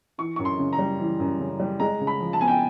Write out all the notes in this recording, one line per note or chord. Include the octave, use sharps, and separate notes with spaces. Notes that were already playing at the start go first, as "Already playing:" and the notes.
E3 C#6
F#2 C#6
C6
C#3
A#5
G3
E3
F#2
C#3
G3
G#3 A#5
C#3
B5
F3
A5
B3 G#5
G5